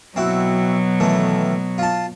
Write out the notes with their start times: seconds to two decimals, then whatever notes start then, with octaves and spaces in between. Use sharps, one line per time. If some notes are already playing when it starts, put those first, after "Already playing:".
0.16 B2 F#3 C4 E4 F#4
1.00 D#3 E3 A3
1.78 F4 A5